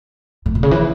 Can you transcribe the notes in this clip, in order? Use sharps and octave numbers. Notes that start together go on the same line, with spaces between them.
A2
B2
C#3
E3